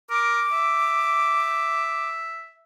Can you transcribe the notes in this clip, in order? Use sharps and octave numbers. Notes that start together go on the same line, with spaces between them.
A#4 D6
E5